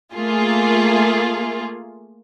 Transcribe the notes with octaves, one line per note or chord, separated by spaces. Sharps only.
A3 A#3 F4 G#4